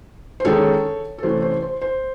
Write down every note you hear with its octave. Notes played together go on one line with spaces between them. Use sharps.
C5
D#3 G#3 C#4 A4 C#5
A4
C3 E3 A3 C#4 C5
C5
C5
C5